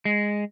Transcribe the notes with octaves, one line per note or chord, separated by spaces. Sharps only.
G#3